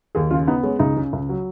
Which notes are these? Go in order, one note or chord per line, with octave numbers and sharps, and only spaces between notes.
D#2 G#4
C#3 F4
B3 D#4
G#3 C#4
C#2 D#4
C#3
C#2
F#3